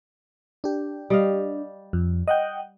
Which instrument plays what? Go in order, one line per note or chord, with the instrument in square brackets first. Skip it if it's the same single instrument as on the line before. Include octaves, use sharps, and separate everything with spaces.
[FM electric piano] D4 G4
[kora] G3 D#5 F5
[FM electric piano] F2
D#5 F#5 G5